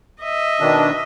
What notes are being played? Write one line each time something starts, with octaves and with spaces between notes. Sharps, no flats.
D#5 E5
B2 D#3 D4